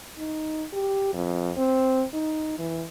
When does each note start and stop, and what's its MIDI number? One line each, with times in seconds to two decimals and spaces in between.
0.18 0.65 63
0.73 1.11 67
1.13 1.51 41
1.57 2.04 60
2.14 2.55 63
2.59 2.85 52